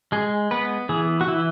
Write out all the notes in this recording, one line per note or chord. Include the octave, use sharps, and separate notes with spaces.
G#3 G#4
B3 B4
E3 G#4
F#4
E3 E4